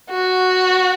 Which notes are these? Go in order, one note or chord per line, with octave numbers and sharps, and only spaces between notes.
F#4